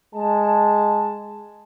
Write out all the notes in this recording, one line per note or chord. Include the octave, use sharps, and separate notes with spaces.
G#3 A5